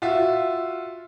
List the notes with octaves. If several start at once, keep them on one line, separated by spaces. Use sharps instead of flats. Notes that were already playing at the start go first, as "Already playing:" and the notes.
F4 F#4 E5